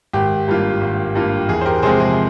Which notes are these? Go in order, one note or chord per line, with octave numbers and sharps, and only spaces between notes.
G#1 G4
G2 G3 A#3 F4
G#1
G2 G3 A#3 F4
E2 G#4
C5
G4 A#4
C3 F3 G#3 C4 G#4 C5
G#4